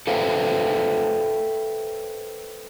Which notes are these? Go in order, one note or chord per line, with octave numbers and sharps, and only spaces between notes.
A4 B4 C5 E5 F5 G5